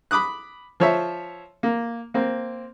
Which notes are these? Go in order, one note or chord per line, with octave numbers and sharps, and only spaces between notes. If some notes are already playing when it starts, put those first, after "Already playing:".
B5 D6 D#6 F#6
F3 C#5 E5
A#3
A#3 C4